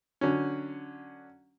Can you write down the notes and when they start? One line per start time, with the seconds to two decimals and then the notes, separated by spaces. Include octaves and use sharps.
0.21 D3 F#3 C#4